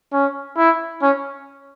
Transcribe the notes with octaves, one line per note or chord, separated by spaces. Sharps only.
C#4
E4
C#4